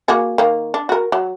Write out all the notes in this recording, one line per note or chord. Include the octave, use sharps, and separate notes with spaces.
A#3 F#4 G#4
D#3 A#3
D4
F#4 A#4
F#3